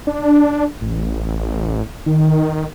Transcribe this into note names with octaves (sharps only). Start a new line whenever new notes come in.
D4
A1
D#3